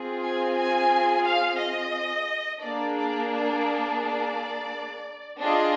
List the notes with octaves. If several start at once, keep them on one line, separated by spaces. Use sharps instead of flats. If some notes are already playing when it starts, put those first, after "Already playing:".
Already playing: C4 F4 G#4
G#5
G#5
F5
D#5
A#3 D4 G#4 D5
D5
D5
D5
D4 F4 G#4 D#5